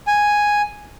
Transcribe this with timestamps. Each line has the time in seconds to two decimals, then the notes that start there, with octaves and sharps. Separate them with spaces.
0.07 G#5